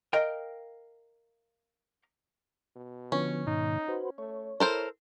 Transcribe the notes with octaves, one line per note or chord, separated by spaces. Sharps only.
A#4 D#5 F5 G5
B2
D3 F3 B3 C#4
G#2 B2 D#3 D#4
F#4 B4 C5
A3 C#5
E4 A4 A#4 C5